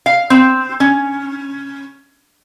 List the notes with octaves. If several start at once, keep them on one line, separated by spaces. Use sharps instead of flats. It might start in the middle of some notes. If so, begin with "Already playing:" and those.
F5
C4
C#4